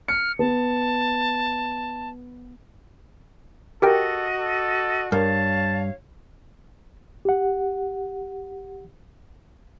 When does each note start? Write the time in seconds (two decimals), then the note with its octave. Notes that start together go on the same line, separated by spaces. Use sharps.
0.08 F6 C#7
0.39 B3 A5
3.82 F#4 G4 A4 A#4 D#5 G5
4.39 A4
5.12 G2 A#4 C#5 F5 A5
7.25 G4 F#5